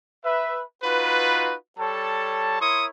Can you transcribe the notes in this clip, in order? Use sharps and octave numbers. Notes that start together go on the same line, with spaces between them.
B4 E5
D#4 F4 F#4 B4
G3 A4 C#5 A5
E4 A#4 C#5 C6 C#6 D#6